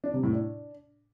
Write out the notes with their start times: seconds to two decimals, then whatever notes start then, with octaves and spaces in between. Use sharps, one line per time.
0.04 D4
0.13 C3
0.23 A2
0.33 D4